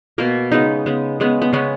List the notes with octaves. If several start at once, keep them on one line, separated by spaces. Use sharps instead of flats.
B2 A#3 A#4
C#3 G#3 B3 D#4
C#3 G#3 B3
C#3 G#3 B3
B3
C#3 G#3 B3 C#4